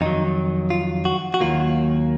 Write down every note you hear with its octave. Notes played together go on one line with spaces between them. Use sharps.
F2 D#3 F#3 D#4
F4
F#4
F#4
D#2 D#3 F#3 A#3 F4